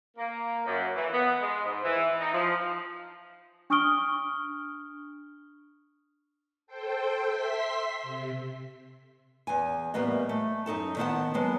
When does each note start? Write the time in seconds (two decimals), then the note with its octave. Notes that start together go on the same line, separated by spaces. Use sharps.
0.17 A#3
0.66 F#2
0.95 E3
1.13 B3
1.41 G#3
1.65 G#2
1.84 E3
2.20 D#4
2.33 F3
3.70 D4 C#6 D#6 F6 D7 G7
6.67 A4 C5 G5
7.24 E5 C6 B6
8.03 C3
9.47 E2 G#5
9.94 A2 E3 G3 A#3 B3 D#5
10.29 A3
10.66 F#2 D#4 A4 A5
10.97 D#3 B3 C4 F5 F#5 A5
11.34 F#3 G#3 A#3 B3